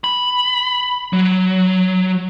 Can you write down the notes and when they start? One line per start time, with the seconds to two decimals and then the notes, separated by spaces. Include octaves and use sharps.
0.04 B5
1.13 F#3